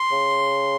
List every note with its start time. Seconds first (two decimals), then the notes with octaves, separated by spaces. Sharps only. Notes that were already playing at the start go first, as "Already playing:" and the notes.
Already playing: C6
0.12 C#3